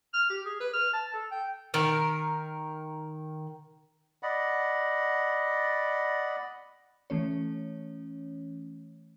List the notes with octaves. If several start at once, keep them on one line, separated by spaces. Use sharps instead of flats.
F6
G4
G#4
B4
F6
A5
A4
G5
D#3 A#4
D5 D#5 F#5 B5
E3 A3 C#4 C#5